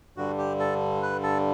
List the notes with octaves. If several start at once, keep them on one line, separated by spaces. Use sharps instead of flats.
G2 D3 G3 F#4
G4
A4
B4
A4